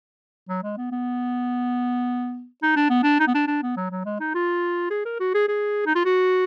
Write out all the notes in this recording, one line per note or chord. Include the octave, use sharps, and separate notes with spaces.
F#3
G#3
B3
B3
D#4
D4
B3
D4
D#4
B3
D4
D4
B3
F#3
F#3
G#3
D#4
F4
G#4
A#4
F#4
G#4
G#4
D#4
F4
F#4